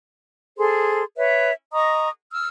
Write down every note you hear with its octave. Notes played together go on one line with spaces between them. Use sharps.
G#4 A4 C5 C6
B4 C#5 E5
D#5 A#5 C#6 D#6
E6 F6